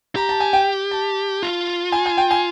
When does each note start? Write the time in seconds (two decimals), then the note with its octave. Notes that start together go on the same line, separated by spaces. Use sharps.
0.16 G4 A#5
0.29 A5
0.40 G#5
0.53 G5
0.91 A5
1.43 F4
1.92 G#5
2.06 G#5
2.17 G5
2.31 G#5